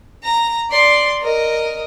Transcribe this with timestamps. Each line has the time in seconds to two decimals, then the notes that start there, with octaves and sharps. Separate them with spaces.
0.24 A#5
0.71 D5 C6
1.21 A#4 D#5